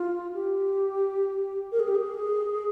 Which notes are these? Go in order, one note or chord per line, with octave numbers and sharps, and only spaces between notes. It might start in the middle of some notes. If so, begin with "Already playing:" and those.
Already playing: F4
G4
A#4
G#4
G4
G#4